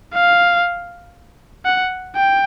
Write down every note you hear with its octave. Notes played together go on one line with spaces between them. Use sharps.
F5
F#5
G5